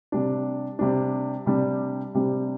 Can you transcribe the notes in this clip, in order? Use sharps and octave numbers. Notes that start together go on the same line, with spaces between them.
C3 G3 D4
C3 G3 D4
C3 G3 D4
C3 G3 D4